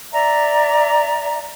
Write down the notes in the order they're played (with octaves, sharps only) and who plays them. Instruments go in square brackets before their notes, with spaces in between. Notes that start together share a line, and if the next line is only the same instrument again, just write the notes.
[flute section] D5 E5 A#5